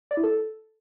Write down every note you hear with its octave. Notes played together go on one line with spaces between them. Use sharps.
D5
E4
A4